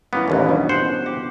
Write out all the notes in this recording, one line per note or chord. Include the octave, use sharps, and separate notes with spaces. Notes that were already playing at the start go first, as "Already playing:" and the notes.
E3 A#3 B3 C#4
A1 D#2 A#2
G2 B2
C5 F#5
G4